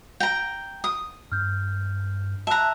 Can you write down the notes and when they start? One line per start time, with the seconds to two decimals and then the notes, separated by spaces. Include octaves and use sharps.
0.20 G5 A#5
0.84 D#6
1.32 G2 F6 G6
2.47 E5 A5 A#5 F#6